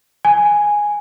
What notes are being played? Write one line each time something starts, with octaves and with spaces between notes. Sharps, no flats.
G#5